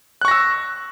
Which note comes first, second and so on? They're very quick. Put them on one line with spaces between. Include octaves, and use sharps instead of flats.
F#6 C#6 A#6 E6